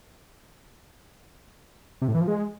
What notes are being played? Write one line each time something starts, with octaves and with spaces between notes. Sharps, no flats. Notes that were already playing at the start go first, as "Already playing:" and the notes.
C3
A2
E3
F3
G#3